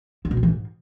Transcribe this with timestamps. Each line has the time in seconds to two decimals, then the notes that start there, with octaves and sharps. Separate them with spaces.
0.25 D3
0.31 B2
0.37 F3
0.43 E3
0.49 G#2